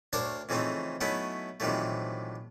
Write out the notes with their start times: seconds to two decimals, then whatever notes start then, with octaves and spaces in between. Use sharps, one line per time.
0.13 D2 D4 A#4 C5 C#5 F5
0.49 F2 C#3 E3 A3 C4 D#4
1.01 F#3 A3 B3 C#4 D#4 E4
1.60 A#1 C3 D#3 E3 F#3 A3